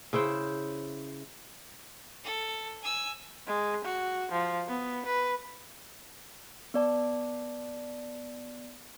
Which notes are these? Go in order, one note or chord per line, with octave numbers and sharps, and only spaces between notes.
C#3 E4 C5 G5
A4
G#5 E6
G#3
F#4
F3
B3
B4
B3 D5 A5